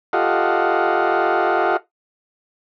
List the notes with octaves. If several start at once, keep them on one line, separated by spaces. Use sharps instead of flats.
F4 G4 A4 D#5 F5 F#5